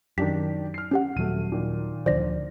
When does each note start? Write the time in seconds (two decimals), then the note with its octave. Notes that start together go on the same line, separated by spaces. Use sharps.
0.18 F#2 D#3 D4 G4 B6
0.74 F6 C7
0.91 C#4 G4 F#5
1.17 D#1 F#3 A3 D#7
1.52 A#2 D#3
2.06 D2 D3 F3 C5 D5 A#6